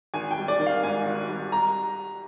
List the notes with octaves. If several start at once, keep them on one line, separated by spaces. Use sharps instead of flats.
G#1 G#5
G5
G3
D5
D#3
F5
G#2 G#5
G#1
G3
A#5